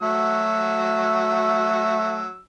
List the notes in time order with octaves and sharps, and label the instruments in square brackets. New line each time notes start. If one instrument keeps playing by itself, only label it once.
[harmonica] F#3 F#4 E6 [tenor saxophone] A3